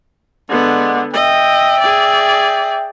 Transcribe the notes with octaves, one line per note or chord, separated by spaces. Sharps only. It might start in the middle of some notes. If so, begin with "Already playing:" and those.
D3 G#3 B3 D5 F#5
D#5 E5 G5
G#4 D5